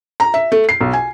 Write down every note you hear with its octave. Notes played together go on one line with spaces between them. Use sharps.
A#5
E5
A3
C7
B1
G#5